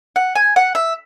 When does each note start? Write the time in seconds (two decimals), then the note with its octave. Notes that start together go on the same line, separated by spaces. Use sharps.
0.16 F#5
0.35 G#5
0.56 F#5
0.75 E5